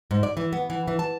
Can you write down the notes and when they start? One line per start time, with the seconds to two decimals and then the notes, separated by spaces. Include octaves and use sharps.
0.11 G#2
0.23 D5
0.37 E3
0.53 B3
0.70 E3
0.88 E3
0.99 A5